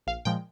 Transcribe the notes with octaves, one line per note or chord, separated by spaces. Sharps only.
A#1 F5
A#2 F3 G#3 G5